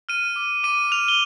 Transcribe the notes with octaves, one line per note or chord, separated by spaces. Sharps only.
F6 D#7
D6
D6 D#7
F6 F7
G7